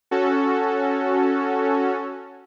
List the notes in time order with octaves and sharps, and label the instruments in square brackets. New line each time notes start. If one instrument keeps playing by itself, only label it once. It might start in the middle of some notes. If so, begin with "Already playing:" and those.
[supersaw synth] C#4 F#4 A4